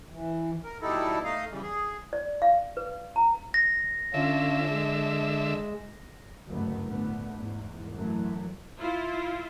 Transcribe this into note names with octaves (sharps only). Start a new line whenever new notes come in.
E3
A#4
B2 G3 D#4 E4 A4
A3 D#4 D#5 F5
C#3 E3 G3
G#4
D5
F5
B4
A#5
A#6
D3 C#4 F4 E5
G#3
F#1 D2 G2 F#3 A3 B3
D2 A2 D3 A3 B3
E2 G#2
F#2 E3 F#3 A3
E4 F4